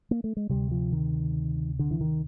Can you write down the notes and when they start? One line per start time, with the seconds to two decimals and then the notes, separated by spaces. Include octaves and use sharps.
0.11 A#3
0.24 A3
0.37 G#3
0.49 D2 C3 G3
0.71 F3
0.92 D#3
1.79 D3
1.91 E3
2.01 D#3